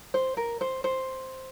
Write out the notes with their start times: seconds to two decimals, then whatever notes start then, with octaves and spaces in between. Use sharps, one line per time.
0.14 C5
0.37 A#4
0.61 C5
0.84 C5